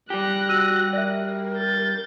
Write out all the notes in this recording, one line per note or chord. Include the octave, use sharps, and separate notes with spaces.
G3 G4 F#6 A#6
F#4 E6 D#7
A#4 D5 E5
G6 A6